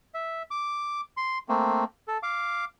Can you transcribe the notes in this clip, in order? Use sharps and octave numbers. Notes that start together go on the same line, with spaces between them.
E5
D6
C6
A3 A#3 C4
A4
F5 D6